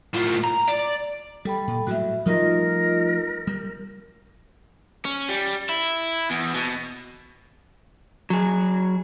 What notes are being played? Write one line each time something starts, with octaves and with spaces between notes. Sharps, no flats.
A2 F4
A#5
D5
G3 A4 G5 B5
A#2
A2 F#3 G3 F#4 E5
F3 G3 A3 D#4 F4 A#4 D#5
G3
C#4
G3
E4
E2
B2
F#3 G#4